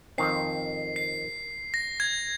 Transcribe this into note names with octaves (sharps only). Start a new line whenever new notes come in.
F2 D#3 C4 C7
C7
A#6
G#6